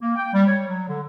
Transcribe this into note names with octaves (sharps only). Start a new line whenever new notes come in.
A#3
G5
G3
C#5
F#3
D3